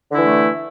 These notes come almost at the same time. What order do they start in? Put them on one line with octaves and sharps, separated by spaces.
D3 E4 E3 A3